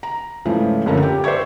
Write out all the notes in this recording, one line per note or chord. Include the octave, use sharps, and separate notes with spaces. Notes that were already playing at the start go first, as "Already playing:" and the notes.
A#5
G#2 C#3 E3 F3 A3
F#1 A#2 D3 C#4 A4 A#4
G4
C5 D5 E5 C#6 G#6